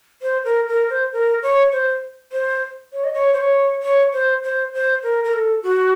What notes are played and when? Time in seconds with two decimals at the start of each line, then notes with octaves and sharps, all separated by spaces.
0.22 C5
0.45 A#4
0.68 A#4
0.90 C5
1.13 A#4
1.43 C#5
1.72 C5
2.32 C5
2.93 C#5
3.04 D#5
3.14 C#5
3.33 C5
3.38 C#5
3.82 C#5
4.13 C5
4.43 C5
4.73 C5
5.03 A#4
5.24 A#4
5.34 A4
5.63 F#4